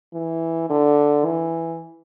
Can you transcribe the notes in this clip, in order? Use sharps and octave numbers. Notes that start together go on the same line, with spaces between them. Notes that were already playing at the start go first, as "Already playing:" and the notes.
E3
D3
E3